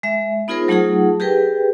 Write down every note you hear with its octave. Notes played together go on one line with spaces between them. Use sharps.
G#3 E5
B3 D#4 F4 G#4 A#4 C5
F#3 A3 D#4 F4 G#4 F#5
G4 G#4 A#4 B4 G5